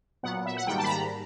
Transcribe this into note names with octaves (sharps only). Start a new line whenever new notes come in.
A#2 F#3 B3 F#5
E5
F#5
G#2 D#3 G3 A#3 G5
A5
B5
A#5